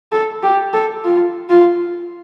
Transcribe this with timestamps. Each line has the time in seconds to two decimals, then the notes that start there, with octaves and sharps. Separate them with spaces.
0.12 A4
0.43 G4
0.73 A4
1.04 F4
1.49 F4